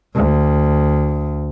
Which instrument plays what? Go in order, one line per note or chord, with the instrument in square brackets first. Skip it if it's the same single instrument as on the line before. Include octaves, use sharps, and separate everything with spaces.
[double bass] D2